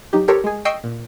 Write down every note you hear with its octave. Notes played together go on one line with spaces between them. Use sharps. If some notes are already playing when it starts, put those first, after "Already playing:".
F#3 D#4 G4
G4 A4 A#4 C5 C#5
G#3 G#4
D#5 G5 C#6 E6 C7 D7
A#2